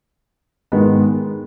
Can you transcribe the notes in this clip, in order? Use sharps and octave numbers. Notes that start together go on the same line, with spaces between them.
G#2 D#3 G#3 B3